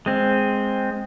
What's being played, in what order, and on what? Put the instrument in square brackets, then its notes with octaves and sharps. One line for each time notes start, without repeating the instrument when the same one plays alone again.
[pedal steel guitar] G#3 C4